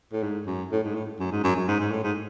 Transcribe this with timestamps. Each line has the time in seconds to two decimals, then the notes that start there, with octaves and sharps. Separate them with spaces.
0.13 A2
0.23 G#2
0.47 F#2
0.72 A2
0.83 G#2
0.95 A2
1.20 F#2
1.31 G#2
1.44 F#2
1.56 F#2
1.68 G#2
1.80 G#2
1.91 A2
2.04 G#2